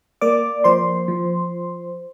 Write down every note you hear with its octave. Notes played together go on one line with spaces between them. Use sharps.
A#3 D5 D6
F3 C5 C6
F3